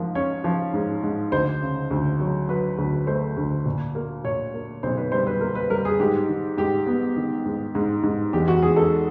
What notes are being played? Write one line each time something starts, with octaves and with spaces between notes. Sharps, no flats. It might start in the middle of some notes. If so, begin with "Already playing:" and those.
Already playing: G#2 F3 A#3
C#4 C#5
F3
G#2
G#2
D2 C5
C#3
D2
F#3
F#3 B4
D2
A3 C5
D2
A#2
A#3
A#2 C#5
A#3
B1 C5
B4
G3 C5
B4
A#3 A#4
B4
G3 A#4
G#4
G#2 G4
D#3
G#2 G4
B3
D#3
G#2
G#2
G#2
E2 G4
F#4
E2 G#4
A4